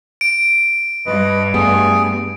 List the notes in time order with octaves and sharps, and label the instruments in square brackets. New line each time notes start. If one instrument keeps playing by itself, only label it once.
[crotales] D7
[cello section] G2 [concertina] B4 D#5
[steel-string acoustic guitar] G3 A3 B3 [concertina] G#4